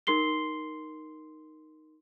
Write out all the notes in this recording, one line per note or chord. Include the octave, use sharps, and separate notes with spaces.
D#4 A#4 C6 C7 G7